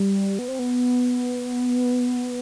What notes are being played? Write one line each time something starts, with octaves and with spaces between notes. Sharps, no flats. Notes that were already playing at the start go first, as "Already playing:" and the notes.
Already playing: G3
B3
C4
B3